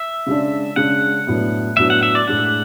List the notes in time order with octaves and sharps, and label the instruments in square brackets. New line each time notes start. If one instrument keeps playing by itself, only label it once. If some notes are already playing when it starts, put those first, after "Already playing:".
Already playing: [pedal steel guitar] E5
[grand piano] C#3 G#3 D4
[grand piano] C#3 G#3 D4 [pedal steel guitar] F#5
[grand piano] A2 F#3 B3 D4
[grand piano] A2 F#3 B3 D4 [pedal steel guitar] E5
[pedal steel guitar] F#5
E5
D5
[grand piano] A2 G#3 D4 [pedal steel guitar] F#5